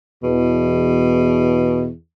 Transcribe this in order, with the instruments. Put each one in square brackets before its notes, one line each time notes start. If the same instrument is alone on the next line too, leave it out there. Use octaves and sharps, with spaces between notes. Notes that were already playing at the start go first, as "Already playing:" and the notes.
[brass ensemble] E2 [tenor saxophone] B2